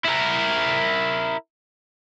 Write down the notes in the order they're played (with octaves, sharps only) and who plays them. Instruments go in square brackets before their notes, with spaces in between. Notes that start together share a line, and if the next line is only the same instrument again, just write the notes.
[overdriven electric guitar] E4 A#4